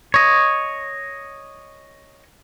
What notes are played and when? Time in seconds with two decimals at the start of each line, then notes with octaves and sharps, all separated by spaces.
0.14 C#5 D#5